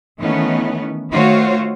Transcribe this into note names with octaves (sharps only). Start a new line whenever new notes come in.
D#3 E3 A3 B3 C#4
D#3 A3 F4 F#4 C5 C#5